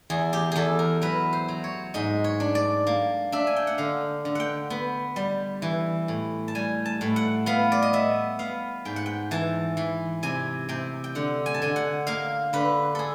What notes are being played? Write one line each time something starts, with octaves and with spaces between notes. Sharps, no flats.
E2 G#4
G4
E2 G#4 A4
A#4
F#3 B4
C5
F#3
C#5
G#2 D#5
C#5
D4
D5
A#3
D4 E5
G#5
G5
F#5
D3 F5
D3
F#5 G5
B3
G3
E3
A2
A5
G3 G#5
A5
A2
F#5
B3 F5
D5
D#5
B3 E5
B3 F5
G#2 G5
F#5
G5
E3 A5
E3
C3 G#5
C3 G5
G5
D3 F#5
G#5
A5
D3 G#5
F#5
A#3 F5
D3 B4
G#4 A4